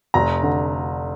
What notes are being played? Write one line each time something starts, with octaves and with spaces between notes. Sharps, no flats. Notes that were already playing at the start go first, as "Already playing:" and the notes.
F1 A#5
D3